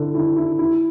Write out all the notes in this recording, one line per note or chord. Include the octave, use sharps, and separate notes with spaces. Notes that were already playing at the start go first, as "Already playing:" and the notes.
Already playing: D3 E4
E4
E4
E4